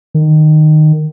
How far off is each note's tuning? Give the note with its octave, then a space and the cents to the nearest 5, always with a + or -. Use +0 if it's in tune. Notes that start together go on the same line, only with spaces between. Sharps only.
D#3 -15